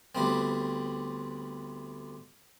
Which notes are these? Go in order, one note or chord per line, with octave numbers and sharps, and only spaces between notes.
D2 G3 B3 C4